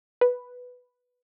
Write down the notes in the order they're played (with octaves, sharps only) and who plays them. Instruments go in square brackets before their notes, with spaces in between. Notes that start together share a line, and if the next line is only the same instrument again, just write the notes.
[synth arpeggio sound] B4